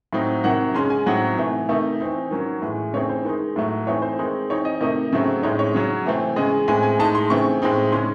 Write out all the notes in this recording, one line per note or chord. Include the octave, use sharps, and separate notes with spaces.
A2 F#3 C4 D#4
C3 D#3 F#3 F#5
C#3 G#3 C#4 C6
G#5
A2 F#3 C4 D#4 F#5
C3 E3 A3
C3 D#3 A3 D#4 E5
E3 C4 D#4
D#3 F#3 C#4
A2 E3 G#3
C#3 E3 A3 C4 D#4 C#5
C5
D#3 G#3 D#4
A2 F#3 A3
E3 A3 C4 D#4 C#5
C5
D#3 G#3 C4 D#4
E3 C4 D#4 C#5
D#5
C3 D#3 A3 D#4 D#5
C#3 F#3 A3 C4
A2 G#3 C4 D#4 C#5
C#5
C#3 F#3 C#4
C3 E3 A3 C4
C#3 E3 G#3 D#5
A2 G#3 C4 G#5
G#5
A2 G#3 D#4 A5
C6
C#3 E3 A3 C4 C#6
A2 G#3 C4 D#4
C#3 G#3 C#4 C6